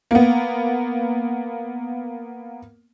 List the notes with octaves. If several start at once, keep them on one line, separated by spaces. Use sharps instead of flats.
A#3 B3